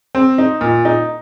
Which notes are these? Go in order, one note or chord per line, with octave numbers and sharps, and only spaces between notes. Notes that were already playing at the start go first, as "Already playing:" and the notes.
C4
D#4
A#2
D#4